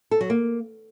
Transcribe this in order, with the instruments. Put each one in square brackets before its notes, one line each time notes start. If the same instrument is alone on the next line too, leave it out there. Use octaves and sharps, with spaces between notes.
[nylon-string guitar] A4
F#3
A#3